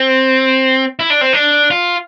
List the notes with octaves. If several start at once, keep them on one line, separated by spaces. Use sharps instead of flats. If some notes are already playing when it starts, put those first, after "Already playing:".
Already playing: C4
E4
D4
C4
D4
F4